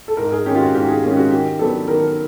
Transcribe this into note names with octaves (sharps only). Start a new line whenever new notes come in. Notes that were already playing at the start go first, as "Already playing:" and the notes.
A4
G#2 A#4
G#4
D#3 G#3 C#4 G4
F4
F#4
G#2 G4
G#4
D#3 G#3 C#4 G4
F#4
D#3 G4
F#3 B3 D4 A4
D#3 A#4